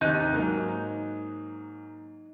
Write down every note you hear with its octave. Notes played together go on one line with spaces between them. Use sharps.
D#2 C3 D#3 D#4 F#6
G#2 F#3 A#3